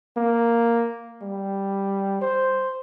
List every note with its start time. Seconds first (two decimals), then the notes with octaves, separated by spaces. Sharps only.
0.17 A#3
1.22 G3
2.21 C5